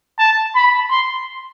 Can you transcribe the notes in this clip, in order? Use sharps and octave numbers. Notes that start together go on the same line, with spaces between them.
A5
B5
C6